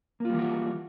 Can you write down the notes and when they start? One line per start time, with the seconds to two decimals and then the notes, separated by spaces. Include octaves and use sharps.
0.20 A#3
0.25 F4
0.29 G3
0.34 E3
0.39 F#4